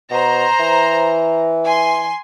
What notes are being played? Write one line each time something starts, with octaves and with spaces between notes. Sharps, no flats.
B2 C5 A#5
E3
G#5 C6